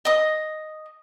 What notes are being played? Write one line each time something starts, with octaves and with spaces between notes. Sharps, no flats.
D#5 D#6